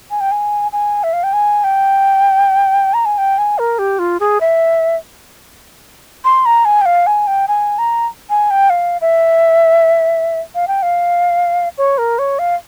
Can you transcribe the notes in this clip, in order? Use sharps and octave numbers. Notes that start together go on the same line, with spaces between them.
G#5
G5
G#5
G#5
E5
F5
G5
G#5
G5
A#5
G#5
G5
G#5
A#4
G4
F4
G#4
E5
C6
A#5
G#5
G5
F5
G#5
G5
G#5
A#5
G#5
G5
F5
E5
F5
G5
F5
C#5
A#4
C#5
F5